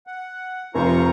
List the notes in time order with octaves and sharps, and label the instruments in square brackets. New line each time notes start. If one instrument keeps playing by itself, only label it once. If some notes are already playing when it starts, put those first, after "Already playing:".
[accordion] F#5
[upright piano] F1 [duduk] F4 [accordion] C5 A#5 C#6